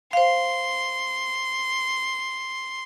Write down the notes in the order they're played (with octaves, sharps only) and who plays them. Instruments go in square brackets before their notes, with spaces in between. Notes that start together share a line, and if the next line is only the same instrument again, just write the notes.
[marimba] C5 F5 [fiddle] C6